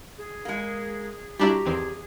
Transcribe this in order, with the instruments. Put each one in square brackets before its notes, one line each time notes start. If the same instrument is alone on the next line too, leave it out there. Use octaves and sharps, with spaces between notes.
[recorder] G#4
[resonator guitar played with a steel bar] G#3 A#3
[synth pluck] G3 D4 E4 [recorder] F#4 [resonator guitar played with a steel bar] G4 A#5
[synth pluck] E2 D#3 C4 [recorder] G#4